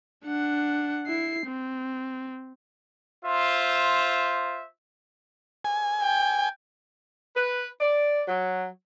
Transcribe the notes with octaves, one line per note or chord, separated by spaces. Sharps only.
D4 F#5
E4 C7
C4
F4 C5 E5
G#5
G5
B4
D5
F#3